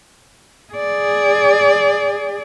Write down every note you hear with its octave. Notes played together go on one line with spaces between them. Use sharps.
G#4 D5